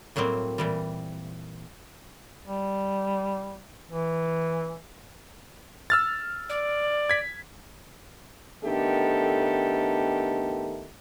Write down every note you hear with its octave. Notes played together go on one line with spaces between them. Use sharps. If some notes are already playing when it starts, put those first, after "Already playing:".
A2 F#3 G3 A#3 C4
A#2 E3 G3
G3
E3
E6 F6 A6
D5
G#6 B6
D#3 A3 B3 D4 G4 A4